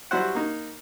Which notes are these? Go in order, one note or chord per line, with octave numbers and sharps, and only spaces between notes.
F#3 G3 E4 F#4 C5 F#5
A#3 D#4